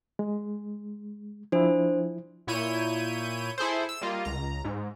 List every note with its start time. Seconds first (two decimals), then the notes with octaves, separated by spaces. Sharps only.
0.19 G#3
1.52 F3 D4 E4 C5
2.47 A#2 E4 C#5 G6 D#7
3.58 E4 G#4 A4 C5
3.89 E6
4.01 G3 A#3 F4 D#5
4.25 C#2 A#5
4.64 G#2